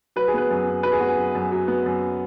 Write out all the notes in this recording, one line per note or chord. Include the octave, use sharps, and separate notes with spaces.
F#3 B4
G#4
B3 B4
F#2
F#2
F#3 B4
G#4
B3 F#4
G#4
F#2
F#2
F#3
B3
F#2